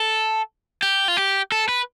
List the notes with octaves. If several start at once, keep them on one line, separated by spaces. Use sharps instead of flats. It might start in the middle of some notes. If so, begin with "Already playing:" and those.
Already playing: A4
G4
F4
G4
A4
B4